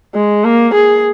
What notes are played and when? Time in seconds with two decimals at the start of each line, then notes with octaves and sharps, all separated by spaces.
0.15 G#3
0.44 A#3
0.74 G#4